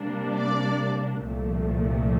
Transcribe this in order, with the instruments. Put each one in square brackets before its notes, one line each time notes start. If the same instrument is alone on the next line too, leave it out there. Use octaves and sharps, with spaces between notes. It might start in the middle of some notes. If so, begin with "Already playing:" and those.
Already playing: [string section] C3 G3 A#3 D4
D5
C2 A#2 F3 A3